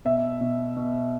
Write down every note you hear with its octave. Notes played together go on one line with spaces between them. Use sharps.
B2 E5
B2
B2